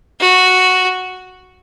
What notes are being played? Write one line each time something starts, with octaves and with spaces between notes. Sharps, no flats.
F#4